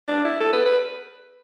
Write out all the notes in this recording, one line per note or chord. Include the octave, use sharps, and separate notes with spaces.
D4
E4
A4
B4
B4